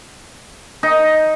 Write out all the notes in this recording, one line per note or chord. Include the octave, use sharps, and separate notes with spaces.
D#4